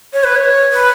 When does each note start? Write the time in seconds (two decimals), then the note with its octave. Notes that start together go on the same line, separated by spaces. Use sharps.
0.13 C#5
0.24 B4
0.35 C#5
0.72 B4